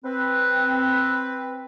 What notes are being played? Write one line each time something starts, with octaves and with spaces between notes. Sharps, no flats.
C4 B4